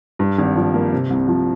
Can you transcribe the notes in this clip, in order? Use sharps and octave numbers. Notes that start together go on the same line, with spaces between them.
G2
G#1
F3
A#3
C3
C2
F3